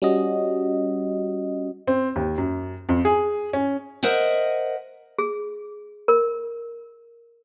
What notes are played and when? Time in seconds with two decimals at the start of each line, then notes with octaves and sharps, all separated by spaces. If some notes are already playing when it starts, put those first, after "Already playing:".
0.02 G3 C#4 F#4 D#5
1.87 C4
2.16 D#2
2.38 F#2
2.89 F2
3.05 G#4
3.53 C#4
4.03 A#4 C5 D#5 E5 F#5
5.19 G#4
6.08 A#4